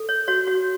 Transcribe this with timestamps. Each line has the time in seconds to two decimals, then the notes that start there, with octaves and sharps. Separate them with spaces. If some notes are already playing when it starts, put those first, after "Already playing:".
Already playing: A4
0.09 C#5
0.28 F#4 C#5
0.47 F#4